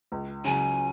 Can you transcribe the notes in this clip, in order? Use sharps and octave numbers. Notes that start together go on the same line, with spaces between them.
C#2
C#3 F#3 G#5